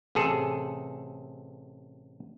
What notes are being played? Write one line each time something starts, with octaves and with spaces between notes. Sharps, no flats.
A1 C3 G#4 A4